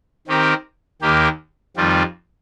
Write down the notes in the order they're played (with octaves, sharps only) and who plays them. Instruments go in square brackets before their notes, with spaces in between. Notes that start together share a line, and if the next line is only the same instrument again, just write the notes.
[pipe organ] D#3 C4 G4 A#4
D#2 D#3 A#3 G4 A#4
F2 D#3 G3 C4 F4